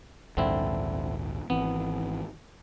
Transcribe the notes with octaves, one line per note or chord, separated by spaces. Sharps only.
A#1 D#2 G#2 D3 C4 E4
G#1 E3 B3 C4